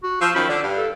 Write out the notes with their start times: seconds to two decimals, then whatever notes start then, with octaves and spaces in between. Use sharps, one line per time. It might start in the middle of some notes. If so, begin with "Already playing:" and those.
0.03 F#4
0.22 F3 E6
0.35 F#2 D#3 F3 B5
0.49 D3 D5
0.63 G2
0.78 A4